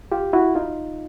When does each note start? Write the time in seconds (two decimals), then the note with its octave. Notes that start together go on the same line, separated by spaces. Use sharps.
0.12 F4 G4
0.33 E4 F#4
0.55 D#4 F4